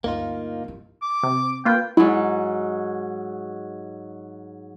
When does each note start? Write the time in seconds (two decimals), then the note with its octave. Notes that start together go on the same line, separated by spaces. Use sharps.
0.04 D2 G2 A#3 D#4 F4
0.64 G2 E4
1.02 D6
1.23 C3
1.65 A#3 F4 B4 G5
1.97 G#2 F#3 E4